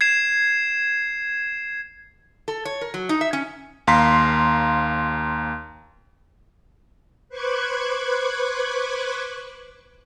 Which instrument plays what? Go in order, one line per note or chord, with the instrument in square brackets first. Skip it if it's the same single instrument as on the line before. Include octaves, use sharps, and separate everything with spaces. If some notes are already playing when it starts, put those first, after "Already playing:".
[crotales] G#6 C7 E7
[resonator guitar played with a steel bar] A4
C#5
A#4
F#3
D#4
E5
C#4
[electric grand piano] D#2 F5 A#5 C6 B6
[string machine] B4 C5 C#6 D6 F#6 G#6